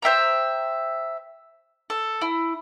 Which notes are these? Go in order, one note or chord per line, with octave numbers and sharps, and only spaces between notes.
C5 E5 G5 A#5
A4
E4